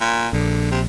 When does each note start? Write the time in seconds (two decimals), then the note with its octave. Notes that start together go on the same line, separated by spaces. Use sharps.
0.01 A#2
0.33 A#1 D3
0.71 C3